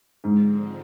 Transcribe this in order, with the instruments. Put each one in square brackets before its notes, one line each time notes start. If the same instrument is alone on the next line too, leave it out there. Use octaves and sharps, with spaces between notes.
[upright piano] G#2 [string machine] D3 F3 G#3 C4